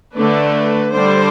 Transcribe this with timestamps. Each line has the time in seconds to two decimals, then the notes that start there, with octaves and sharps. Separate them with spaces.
0.14 D3 A3 D4 B4
0.93 D3 G3 D4 C5